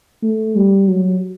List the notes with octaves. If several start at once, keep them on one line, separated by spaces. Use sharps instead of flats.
A3
G3
F#3